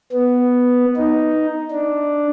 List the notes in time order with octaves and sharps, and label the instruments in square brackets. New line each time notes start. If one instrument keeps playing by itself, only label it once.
[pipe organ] B3
D#4
D4